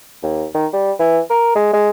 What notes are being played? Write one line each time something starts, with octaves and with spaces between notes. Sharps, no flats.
D#2
D#3
G3
E3
A#4
G#3
G#3